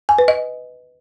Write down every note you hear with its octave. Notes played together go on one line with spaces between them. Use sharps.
G#5
B4
D#5